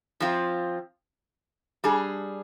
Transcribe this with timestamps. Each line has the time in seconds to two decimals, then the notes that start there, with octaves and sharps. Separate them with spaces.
0.20 F3 C4 F4
1.84 G3 D4 G#4